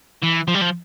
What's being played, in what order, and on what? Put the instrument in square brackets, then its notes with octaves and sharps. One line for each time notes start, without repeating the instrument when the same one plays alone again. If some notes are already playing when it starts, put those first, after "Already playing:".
[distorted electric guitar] E3
F3
G3
F3